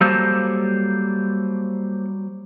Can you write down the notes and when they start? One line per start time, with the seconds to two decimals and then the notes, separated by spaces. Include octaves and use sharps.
0.01 F#3 G3 A#3 A4 C5